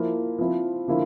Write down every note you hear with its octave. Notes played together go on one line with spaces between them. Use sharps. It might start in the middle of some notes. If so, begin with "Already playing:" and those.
Already playing: F3 A#3 E4
F3 C4 E4
D3 F3 A#3 E4